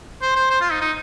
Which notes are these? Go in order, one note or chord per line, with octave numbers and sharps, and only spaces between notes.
C5
C5
C5
F4
D#4
D#4